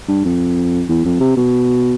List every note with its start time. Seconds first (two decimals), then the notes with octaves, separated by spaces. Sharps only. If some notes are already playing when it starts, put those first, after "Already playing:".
0.08 G2
0.25 F2
0.89 E2
1.05 F2
1.20 C3
1.37 B2